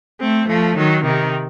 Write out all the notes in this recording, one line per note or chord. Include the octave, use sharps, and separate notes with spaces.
A3 C4
F3 A3
D#3 F#3
C3 D#3